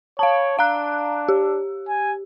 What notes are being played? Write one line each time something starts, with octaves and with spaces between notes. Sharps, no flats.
C#5 F5 A5
D4 F5 A#5 F#6
G4
G#5